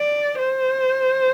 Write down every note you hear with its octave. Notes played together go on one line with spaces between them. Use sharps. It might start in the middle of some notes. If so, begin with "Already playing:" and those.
Already playing: D5
C5